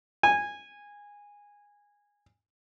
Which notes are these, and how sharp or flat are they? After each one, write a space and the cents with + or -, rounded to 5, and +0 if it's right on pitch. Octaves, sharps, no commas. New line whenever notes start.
G#5 -15